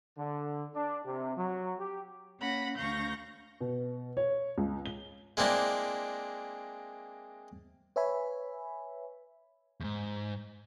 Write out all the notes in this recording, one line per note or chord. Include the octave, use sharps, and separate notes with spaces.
D3
D4
C3
F#3
G4
A#3 C#4 F#5 B5 A#6
D2 F5 C#6 G6 A#6
B2
C#5
C#2
G7
G#3 A#3 C4 D4 E4
B4 C#5 E5 G#5 B5
E2 G#2